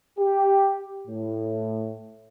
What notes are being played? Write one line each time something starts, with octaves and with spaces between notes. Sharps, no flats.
G4
A2